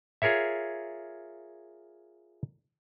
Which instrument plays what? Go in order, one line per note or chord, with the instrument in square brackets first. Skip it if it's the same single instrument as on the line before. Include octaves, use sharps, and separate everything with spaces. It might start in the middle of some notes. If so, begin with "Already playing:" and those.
[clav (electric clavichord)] F4 G#4 A#4 C#5 E5